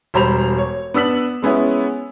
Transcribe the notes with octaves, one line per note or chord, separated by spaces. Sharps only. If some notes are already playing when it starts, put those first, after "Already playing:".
E1 G3 C5 A#5 B5 F7
C#5
B3 D4 E6 B6 F#7
G#3 B3 C#4 E4